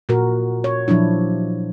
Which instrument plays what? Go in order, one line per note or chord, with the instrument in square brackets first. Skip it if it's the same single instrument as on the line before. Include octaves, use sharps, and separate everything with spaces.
[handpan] A#2 F#4 A#4
C#5
A#2 F3 F#3 D4 E4